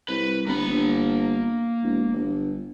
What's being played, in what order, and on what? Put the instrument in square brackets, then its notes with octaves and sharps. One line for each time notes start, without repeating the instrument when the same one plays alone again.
[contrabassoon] C2 [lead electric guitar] B4
[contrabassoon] G1 [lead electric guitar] A#3 B5
[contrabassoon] G1
E1
G1